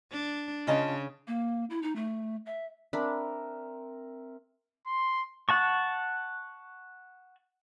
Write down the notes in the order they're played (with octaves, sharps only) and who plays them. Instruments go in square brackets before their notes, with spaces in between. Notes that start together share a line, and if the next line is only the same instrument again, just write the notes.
[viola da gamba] D4
[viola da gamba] C#3 [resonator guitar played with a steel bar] F4 D#5 A5
[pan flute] A#3
E4
D#4
A3
E5
[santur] C4 A#4 E5 [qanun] D4 B5
[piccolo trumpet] C6
[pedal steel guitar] F#5 A5 C#6